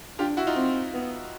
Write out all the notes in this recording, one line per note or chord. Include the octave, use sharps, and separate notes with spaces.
D4 F4 G4
E4 F#4
D#4 F4
C4
B3